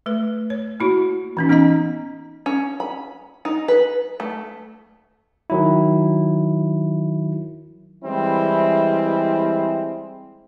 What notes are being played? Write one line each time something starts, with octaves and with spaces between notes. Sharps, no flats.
A3 B4
C#5
A#3 E4 F#4
E3 C#4 D#4
B3 C#4 D#4 D#5 A#5
C#4
B5
D#4
B4
A3
D#3 F#3 E4
E3 G3 G#3 C4 E4